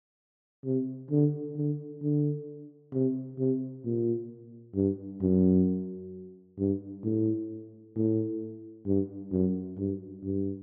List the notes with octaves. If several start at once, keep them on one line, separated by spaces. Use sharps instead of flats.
C3
D3
D3
D3
C3
C3
A#2
G2
F#2
G2
A2
A2
G2
F#2
G2
G2